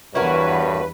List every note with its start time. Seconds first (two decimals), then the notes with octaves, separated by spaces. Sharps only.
0.15 E2 G2 E4 F#4 A#4 B4 C#5